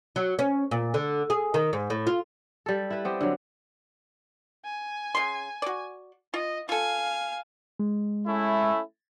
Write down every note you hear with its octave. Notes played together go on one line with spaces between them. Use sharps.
F#3
C#4
A#2
D3
G#4
D#3
G#2
A2
F4
G3 A4
E4 B4
B3 C4 G4
D3 F#3
G#5
C#3 C6
F#4 D5
F4 D#5
F4 A4 F5 G#5
G#3
A3 C#4 E4